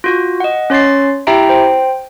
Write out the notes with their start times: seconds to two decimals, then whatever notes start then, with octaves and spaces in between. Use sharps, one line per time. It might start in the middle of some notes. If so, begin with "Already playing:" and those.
0.04 F4 F#4
0.40 D#5 F#5
0.70 C#4 C#5 C6 A6 C7
1.27 E4 G4 E5 G5 A#5 D7
1.49 C5 G5